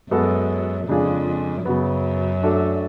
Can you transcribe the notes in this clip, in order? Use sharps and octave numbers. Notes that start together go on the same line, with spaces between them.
F#2 G#3 B3 F#4 A4
F2 C#3 G#3 D4 F4 G#4
F#2 C#3 F#3 B3
A3 D4 F#4 A4 D5